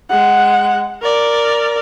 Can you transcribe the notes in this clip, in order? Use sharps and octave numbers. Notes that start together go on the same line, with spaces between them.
G#3 F#5
A#4 D5